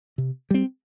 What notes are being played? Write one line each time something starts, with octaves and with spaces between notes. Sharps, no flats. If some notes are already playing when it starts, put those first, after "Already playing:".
C3
G3 C4